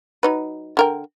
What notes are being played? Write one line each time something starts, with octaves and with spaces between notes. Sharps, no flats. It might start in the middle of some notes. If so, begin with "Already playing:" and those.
F#3 D#4 B4
D3 A#4 G5